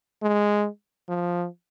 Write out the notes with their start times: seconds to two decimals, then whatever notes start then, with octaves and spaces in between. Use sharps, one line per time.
0.22 G#3
1.09 F3